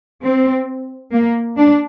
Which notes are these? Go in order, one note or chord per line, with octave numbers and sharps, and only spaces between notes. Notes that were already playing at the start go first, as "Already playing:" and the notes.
C4
A#3
D4